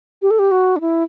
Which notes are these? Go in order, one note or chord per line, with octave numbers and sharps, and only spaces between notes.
G4
A4
G4
F#4
D4
E4